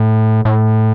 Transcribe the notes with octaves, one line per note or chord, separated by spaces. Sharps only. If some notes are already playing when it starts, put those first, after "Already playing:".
Already playing: A2
A2